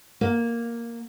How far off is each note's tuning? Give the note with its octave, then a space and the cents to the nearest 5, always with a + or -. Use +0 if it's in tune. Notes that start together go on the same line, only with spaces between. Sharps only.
A#3 +0